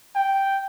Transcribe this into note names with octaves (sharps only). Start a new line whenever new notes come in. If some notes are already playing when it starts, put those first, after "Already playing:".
G5